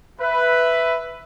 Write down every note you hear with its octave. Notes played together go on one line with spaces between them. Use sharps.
B4 E5